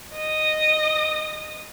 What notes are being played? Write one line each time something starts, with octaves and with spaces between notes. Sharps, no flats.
D#5 D#6